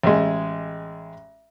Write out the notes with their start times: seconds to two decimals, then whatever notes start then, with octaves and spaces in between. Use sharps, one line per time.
0.04 A1 G#3